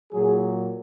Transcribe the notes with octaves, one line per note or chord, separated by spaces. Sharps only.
A#2 F#3 G#4